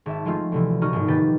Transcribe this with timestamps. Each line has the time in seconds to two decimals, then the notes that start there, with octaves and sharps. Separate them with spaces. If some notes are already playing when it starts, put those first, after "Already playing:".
0.06 G#1 E5 A5
0.25 F3 G#3 A3 C4 F4
0.52 D2 C3 E3
0.81 D#1 D#4 F#4 C#6 D#6 F6
0.93 A#1 G#2
1.08 D#3 A#3 G4 B4 A6